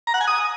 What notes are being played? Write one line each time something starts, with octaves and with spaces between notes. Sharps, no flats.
A#5
F#5
G#5
D#6